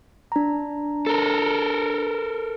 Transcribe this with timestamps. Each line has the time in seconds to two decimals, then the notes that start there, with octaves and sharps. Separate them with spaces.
0.32 D4 A#5
1.07 A4 A#4